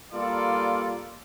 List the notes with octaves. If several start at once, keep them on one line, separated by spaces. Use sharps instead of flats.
G3 A#3 F4 A4 D5